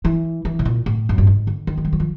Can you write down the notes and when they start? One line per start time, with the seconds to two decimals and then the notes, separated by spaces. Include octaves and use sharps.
0.05 E3
0.45 E3
0.59 B2
0.65 A#2
0.86 A2
1.09 F#2
1.18 G2
1.27 G#2
1.47 D3
1.67 D#3
1.77 G#3
1.85 G3
1.93 F#3
2.00 F3